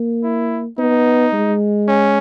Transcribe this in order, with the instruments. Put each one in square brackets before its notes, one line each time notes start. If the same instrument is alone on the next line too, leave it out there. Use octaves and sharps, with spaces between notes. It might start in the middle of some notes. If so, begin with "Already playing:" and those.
Already playing: [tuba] A#3
[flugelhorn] E4
[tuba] B3 [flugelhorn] D#4
[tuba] G#3
[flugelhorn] C#4